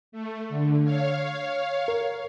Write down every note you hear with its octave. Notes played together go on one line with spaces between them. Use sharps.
A3
D3
C#5 F5
A#4